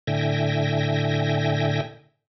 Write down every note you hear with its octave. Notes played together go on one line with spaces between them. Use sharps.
A2 D3 E5 G5 G#5 A#6